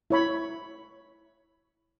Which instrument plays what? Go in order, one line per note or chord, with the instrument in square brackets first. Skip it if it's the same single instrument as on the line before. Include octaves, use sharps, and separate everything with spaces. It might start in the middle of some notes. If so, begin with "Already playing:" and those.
[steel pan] E4 C#5 B5